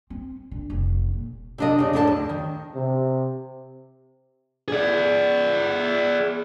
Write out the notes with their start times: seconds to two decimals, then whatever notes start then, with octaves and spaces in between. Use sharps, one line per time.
0.10 C4
0.51 D3
0.70 F1
1.13 A#2
1.58 C3 D4 D#5
1.79 C#3 D4
1.93 A2 C#3 D4 C5 F5 A5
2.07 D2 D#5
2.29 D#3
2.75 C3
4.68 G#4 D5